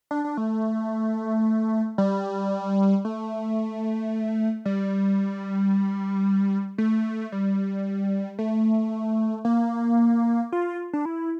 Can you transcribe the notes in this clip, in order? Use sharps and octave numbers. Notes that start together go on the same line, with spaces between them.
D4
D4
A3
G3
A3
G3
A3
G3
A3
A#3
F4
D4
E4